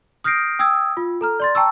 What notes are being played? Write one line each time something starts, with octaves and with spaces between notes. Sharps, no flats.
D#6 F6 G6 A#6 C7 D7
G5 D#6 E6 G#6
F4
A4 A#5 F6
D5 C6 A6
G5 A5 A#5 C#6 E6